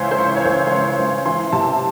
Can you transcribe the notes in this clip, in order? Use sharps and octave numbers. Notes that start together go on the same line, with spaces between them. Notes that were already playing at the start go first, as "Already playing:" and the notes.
Already playing: C#2 E3 C5 C#5
C5
C#3 C#5
C#5
C#2 C5
C5
C#3 C#5
C#2
E3 C6
C3 A5